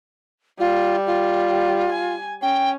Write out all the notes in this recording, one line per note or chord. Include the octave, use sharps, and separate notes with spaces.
G3 F4
F4
G#5
C#4 G5